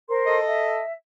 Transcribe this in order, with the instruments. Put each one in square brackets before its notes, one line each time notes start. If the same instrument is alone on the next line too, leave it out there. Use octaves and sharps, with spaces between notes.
[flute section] A#4 C5 C6
[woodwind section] A4 D#5
[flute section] E5